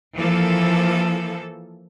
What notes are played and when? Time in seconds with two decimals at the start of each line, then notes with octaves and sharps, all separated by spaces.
0.16 E3 F3 A#3 A4